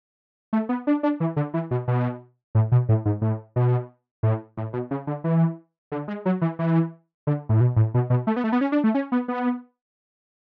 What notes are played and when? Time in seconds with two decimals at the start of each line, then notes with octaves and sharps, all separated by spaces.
0.53 A3
0.69 B3
0.87 D4
1.03 D4
1.20 E3
1.36 D3
1.54 E3
1.71 B2
1.88 B2
2.55 A2
2.72 B2
2.89 A2
3.06 G#2
3.22 A2
3.56 B2
4.23 A2
4.57 A2
4.73 B2
4.91 C#3
5.07 D3
5.24 E3
5.92 D3
6.08 G#3
6.26 F#3
6.42 E3
6.59 E3
7.27 D3
7.49 A2
7.61 B2
7.76 A2
7.94 B2
8.10 B2
8.27 A3
8.36 B3
8.44 A3
8.52 B3
8.61 C#4
8.72 D4
8.84 A3
8.95 C#4
9.12 B3
9.28 B3